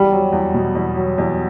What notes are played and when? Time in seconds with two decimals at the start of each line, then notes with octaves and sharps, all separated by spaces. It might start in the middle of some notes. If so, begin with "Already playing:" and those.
Already playing: E2 G3
0.12 F#3
0.32 E2
0.54 B2
0.75 E2
0.96 F#3
1.18 E2